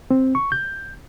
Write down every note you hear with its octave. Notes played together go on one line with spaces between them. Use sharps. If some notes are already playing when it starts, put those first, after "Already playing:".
C4
C#6
G6